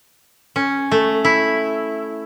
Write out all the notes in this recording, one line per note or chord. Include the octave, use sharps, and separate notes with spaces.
C#4
A3
E4